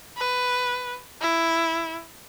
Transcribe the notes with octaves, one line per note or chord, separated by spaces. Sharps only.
B4
E4